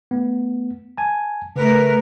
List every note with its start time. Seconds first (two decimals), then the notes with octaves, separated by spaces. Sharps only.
0.11 A3 B3
0.98 G#5 A5
1.56 C#3 A3 A#4 B4